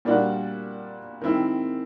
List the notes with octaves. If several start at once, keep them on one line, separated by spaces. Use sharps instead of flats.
A#2 G3 A#3 D4 F#4
D#3 G#3 C4 E4